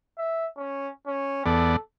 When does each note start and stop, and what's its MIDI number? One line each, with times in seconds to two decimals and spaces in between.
0.18 0.47 76
0.58 0.90 61
1.07 1.44 61
1.46 1.76 40
1.46 1.76 59
1.46 1.79 69
1.46 1.76 74